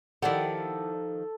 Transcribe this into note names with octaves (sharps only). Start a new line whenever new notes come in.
D#3 F3 E4 G4 A4 D5 F#5